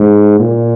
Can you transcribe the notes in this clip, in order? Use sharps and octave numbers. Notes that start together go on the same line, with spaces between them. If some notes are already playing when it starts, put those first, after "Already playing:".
Already playing: G#2
A#2